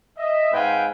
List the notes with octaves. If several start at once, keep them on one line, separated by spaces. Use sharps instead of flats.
D#5 E5
G#2 C4 B4 F5 G5 G#5